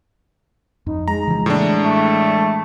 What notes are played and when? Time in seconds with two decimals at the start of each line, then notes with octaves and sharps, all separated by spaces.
0.86 F2 D#4
1.08 G#3 A#5
1.27 C#3 E3 F3
1.46 A2 E3 A#3 D4
1.84 A3